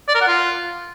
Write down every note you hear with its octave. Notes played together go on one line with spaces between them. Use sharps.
D5
A#4
F#5
F4